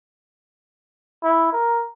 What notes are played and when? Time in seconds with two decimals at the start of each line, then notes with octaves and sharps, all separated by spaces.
1.23 E4
1.52 A#4